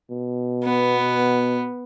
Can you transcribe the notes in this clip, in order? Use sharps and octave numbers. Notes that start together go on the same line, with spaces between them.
B2
B3